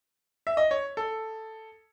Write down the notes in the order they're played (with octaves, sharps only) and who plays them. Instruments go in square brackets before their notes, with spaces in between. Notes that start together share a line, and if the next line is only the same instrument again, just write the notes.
[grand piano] E5
D#5
C#5
A4